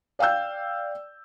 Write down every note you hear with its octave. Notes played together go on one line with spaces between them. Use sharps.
D5 F5 G5 E6 G6